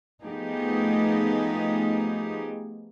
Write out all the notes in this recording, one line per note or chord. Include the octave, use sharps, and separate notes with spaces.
F3 A3 B3 D#4 G4 G#4